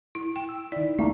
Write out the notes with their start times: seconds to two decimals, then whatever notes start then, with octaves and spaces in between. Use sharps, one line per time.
0.15 E4
0.36 G5
0.49 E6
0.72 D#3 E4 D5
0.99 A3 A#3 D#4